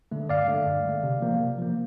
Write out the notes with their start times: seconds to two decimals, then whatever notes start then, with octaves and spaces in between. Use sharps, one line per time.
0.12 D3 A3
0.29 G2 D5 F5
0.48 D3 A3
0.67 G2
0.85 D3 A3
1.03 C3
1.22 F3 A#3
1.40 C3
1.58 F3 A#3